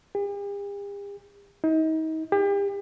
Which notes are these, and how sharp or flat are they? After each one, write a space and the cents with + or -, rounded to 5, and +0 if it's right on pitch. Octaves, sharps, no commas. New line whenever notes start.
G4 +45
D#4 +35
G4 +35